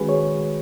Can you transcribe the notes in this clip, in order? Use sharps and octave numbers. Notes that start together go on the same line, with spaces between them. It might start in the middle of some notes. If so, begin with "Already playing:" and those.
Already playing: D#3 G#3 C#4 F#4 G#4 B4
C#5